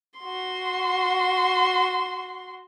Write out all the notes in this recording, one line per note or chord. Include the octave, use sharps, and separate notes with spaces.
F#4 C6